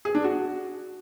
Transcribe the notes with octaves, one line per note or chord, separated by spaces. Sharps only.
G#4
D4
F#4